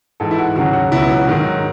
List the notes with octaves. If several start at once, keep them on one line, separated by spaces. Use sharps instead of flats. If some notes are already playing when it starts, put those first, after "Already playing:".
G#2 E3 A4
E4
F#4
D#2 C#3 F#3 F#4
F#4
C#2 B2 F#3 E4
F#4
G#2 D#3 F#3